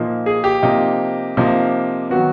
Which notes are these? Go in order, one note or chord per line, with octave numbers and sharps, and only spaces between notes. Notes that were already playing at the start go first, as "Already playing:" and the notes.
Already playing: A#2 F3 A#3 D#4
G#4
G4
C3 F3 A#3 D#4
C3 F3 A#3 D#4
D#3 F#3 B3 F#4